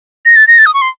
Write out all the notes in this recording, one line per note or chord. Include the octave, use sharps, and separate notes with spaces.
A#6
A6
A#6
A6
D#6
C#6
C6